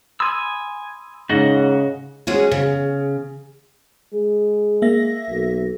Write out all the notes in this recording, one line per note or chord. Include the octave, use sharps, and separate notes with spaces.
G#5 B5 C6 D#6 E6
G#2 C#3 F#4 D#5 F#5
G#3 C#4 F#4 G#4
C#3
G#3
A#3 E5 A#6
B1